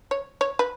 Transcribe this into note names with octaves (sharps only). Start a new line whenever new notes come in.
C#5
C#5
B4